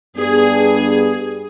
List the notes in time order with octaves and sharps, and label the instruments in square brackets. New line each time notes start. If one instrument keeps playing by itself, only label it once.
[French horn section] G2 B3 [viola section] G#4